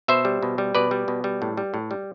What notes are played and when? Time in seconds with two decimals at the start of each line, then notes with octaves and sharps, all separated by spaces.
0.08 B2 C5 E5
0.25 G3
0.43 B2
0.58 G3
0.75 B2 B4 D5
0.91 G3
1.08 B2
1.24 G3
1.42 A2
1.57 G3
1.74 A2
1.91 G3